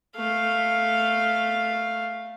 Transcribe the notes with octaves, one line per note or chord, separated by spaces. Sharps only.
A3 F5